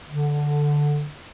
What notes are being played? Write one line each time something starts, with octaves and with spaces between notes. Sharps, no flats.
D3